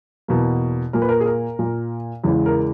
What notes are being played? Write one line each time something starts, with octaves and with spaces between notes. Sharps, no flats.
E2 B2 A#3
A#2 A#3 A#4
B4
A#4
G#4
A#4
A#2 A#3
E2 C#3 E3 G#3
A#4